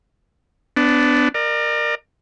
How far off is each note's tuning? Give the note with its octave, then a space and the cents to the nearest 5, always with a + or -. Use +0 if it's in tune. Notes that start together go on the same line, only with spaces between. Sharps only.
B3 +20 D4 -5
A#4 +0 D5 +35